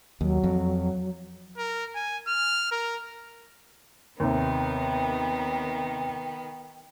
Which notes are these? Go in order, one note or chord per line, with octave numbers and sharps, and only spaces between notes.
D#2 F#3
F2
A#4
G#5
F6
A#4
D#2 C3 D#3 B3 G5